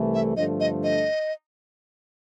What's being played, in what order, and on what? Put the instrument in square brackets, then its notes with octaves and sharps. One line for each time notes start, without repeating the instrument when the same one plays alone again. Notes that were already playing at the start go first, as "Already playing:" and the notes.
Already playing: [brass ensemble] C2 C3 E3 A3
[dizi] E5
[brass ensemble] G2 D3 F3 A3 D4 [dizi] D#5
[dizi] D#5
D#5